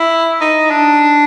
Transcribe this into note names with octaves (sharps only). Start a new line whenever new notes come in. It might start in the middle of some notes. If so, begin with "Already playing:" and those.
Already playing: E4
D#4
D4